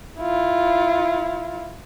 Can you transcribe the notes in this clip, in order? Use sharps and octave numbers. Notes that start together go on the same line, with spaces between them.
E4 F4